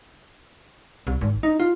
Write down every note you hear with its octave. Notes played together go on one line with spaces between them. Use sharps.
C2
G#1
D#4
F4